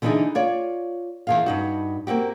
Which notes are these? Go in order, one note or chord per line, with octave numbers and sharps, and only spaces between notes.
D3 E3 B3 D4 D#4 G#4
F4 C#5 D5
E2 C#3 F5
G2 D#4 F#4
A#3 C4 F#4 G4